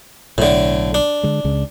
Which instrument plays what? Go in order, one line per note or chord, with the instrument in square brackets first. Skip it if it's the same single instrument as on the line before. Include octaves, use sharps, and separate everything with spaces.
[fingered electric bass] B1 [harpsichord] A2 D3
[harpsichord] D4
[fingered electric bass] D3 G#3
C#2 C#3 G#3